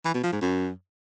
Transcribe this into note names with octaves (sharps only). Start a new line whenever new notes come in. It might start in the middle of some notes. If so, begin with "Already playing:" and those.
E3
B2
F3
G#2
F#2